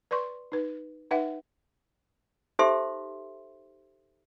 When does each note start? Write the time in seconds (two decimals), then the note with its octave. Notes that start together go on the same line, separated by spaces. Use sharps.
0.11 B4 D5 C6 C#6
0.52 D#4 B4
1.11 D#4 B4 E5 F#5 G5
2.59 D#4 G4 A4 C5 E5 C6